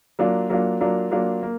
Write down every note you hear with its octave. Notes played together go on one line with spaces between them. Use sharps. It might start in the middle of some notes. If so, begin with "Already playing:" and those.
F#3 A#3 D4 F4
F#3 A#3 D4 F4
F#3 A#3 D4 F4
F#3 A#3 D4 F4
A#3